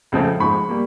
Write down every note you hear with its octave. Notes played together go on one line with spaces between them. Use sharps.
C#2 C#3 F3 A3
G#2 F3 G#3 B5 C#6
G3 A#3